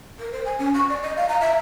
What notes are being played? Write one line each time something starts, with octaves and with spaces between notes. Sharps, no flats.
A#4
C5
G#5
C#4
C#6
D5
D#5
F5
A#5
E5